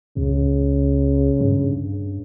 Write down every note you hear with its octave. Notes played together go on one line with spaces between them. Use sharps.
C#2 C#3
G2